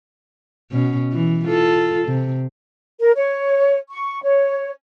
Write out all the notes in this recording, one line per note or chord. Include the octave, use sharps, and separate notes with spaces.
B2 C#4
E3
F4 A4
C3
A#4
C#5
C#6
C#5